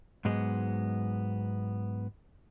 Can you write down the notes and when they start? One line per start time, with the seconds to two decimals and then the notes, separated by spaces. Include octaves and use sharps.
0.25 G#2 F#3 G#3 B3